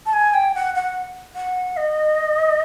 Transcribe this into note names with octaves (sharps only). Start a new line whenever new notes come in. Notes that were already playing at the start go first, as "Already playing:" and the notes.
A5
G#5
G5
F#5
F#5
F#5
D#5